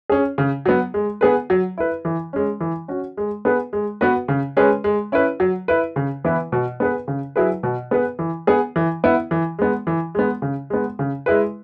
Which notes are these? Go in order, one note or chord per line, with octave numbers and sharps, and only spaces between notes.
C#4 G#4
C#3
F#3 B3
G#3
B3 G#4 B4
F#3
E4 B4
E3
G#3 C#4
E3
C#4 F#4
G#3
B3 G#4 B4
G#3
B3 F#4 B4
C#3
G#3 C#4 G#4 B4
G#3
C#4 E4 B4
F#3
E4 B4
C#3
E3 B3 E4 B4
B2
B3 G#4 B4
C#3
F#3 E4 G#4 B4
B2
B3 G#4 B4
E3
B3 G#4
E3
B3 E4
E3
G#3 B3
E3
G#3 B3
C#3
G#3 B3
C#3
G#3 E4 G#4 B4